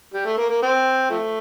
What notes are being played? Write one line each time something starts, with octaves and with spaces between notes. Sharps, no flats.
G3
A3
A#3
A#3
C4
F3 A3